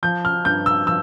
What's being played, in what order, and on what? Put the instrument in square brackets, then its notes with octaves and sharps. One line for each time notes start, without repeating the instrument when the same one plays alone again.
[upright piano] F3 G6
F6
G2 G6
E6
F3 E6